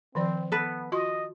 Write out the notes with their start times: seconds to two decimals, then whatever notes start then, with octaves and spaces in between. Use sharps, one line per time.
0.15 D#3 F3 C4 D5
0.52 B3 A4 B4
0.92 F4 F#4 D#5 C6